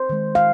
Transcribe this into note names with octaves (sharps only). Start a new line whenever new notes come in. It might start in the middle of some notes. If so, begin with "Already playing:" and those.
Already playing: C5
D#3 G#3
F5